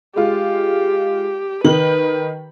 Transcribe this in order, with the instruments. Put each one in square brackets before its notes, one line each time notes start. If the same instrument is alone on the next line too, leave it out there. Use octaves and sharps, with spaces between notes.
[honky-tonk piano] G#3 F4 [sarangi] G4
[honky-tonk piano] D#3 F#7 [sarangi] B4